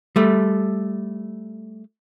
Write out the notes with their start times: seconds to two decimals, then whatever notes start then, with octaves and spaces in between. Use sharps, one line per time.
0.16 G3 A3